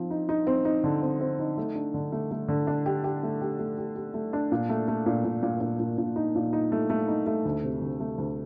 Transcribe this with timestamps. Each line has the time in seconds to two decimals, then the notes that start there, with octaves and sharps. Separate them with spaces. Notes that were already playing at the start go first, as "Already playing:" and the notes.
Already playing: F3 C4 D#4
0.11 D#4
0.29 D#4
0.47 C4
0.65 D#4
0.84 D3
1.02 C4
1.20 C4
1.39 D#4
1.57 A3
1.75 D4
1.94 D3
2.12 A3
2.31 A3
2.48 D3
2.67 D4
2.86 G4
3.04 G4
3.23 A3
3.41 G4
3.59 A3
3.78 G4
3.95 G4
4.14 A3
4.33 D4
4.52 A#2
4.69 A3
4.88 A3
5.06 A#2
5.24 A#2
5.43 A#2
5.61 A#2
5.80 A#2
5.98 A#2
6.16 D#4
6.35 A#2
6.53 D#4
6.72 A3
6.90 A3
7.08 D#4
7.26 A3
7.45 D2
7.64 C3
7.82 D2
8.00 A3
8.18 D2